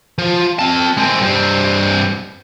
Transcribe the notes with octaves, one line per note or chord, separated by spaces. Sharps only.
F3
C4 A5
G#3 C4
G2 C4